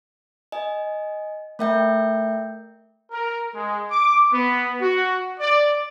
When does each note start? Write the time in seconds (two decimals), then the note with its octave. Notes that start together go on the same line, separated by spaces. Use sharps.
0.52 D#5 G#5
1.59 A3 A#4 E5 G5 G6
3.11 A#4
3.54 G#3
3.90 D6
4.31 B3
4.80 F#4
5.39 D5